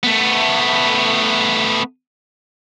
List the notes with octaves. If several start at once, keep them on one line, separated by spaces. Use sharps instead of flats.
A3 B3